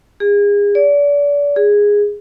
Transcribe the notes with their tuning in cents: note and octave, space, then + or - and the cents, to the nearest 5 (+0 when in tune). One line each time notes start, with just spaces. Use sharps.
G#4 -30
D5 -35
G#4 -10